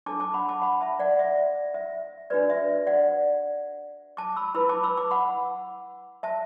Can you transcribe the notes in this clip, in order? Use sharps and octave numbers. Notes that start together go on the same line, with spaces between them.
D4 A4 A5 D6
A5 D6
F#5 B5
A5 D6
F#5 B5
E5 A5
D5 F#5
E5
E5
D4 F#4 B4 D5
E5
E5
D5 F#5
A5 D6
B5 E6
E4 B4 B5 E6
A5 D6
B5 E6
A5 D6
F#5 B5
E5 A5